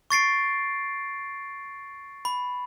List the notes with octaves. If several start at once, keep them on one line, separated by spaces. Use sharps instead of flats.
C#6 A6 C7 D7
B5